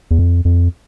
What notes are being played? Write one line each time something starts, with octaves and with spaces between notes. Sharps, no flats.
E2
F2
F2